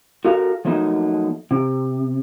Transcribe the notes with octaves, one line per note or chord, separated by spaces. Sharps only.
F#4 A4 A#4 F5
F3 F#3 A3 A#3 D#4
C3